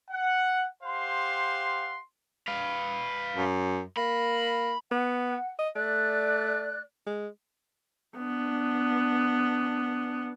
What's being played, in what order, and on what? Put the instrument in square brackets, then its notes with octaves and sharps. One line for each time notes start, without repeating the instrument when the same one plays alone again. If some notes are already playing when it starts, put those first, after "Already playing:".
[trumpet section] F#5
G4 C5 F5 F#5 C6
[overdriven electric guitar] B4 F5
[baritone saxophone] F#2
[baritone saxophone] A#3 [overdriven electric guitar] B5
[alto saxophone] B3 [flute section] F#5
[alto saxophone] D#5
[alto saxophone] A3 [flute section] D5 F#6
[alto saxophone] G#3
[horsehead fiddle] B3 D4